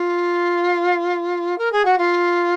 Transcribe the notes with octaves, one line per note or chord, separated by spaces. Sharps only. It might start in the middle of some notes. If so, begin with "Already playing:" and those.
Already playing: F4
A#4
G#4
F#4
F4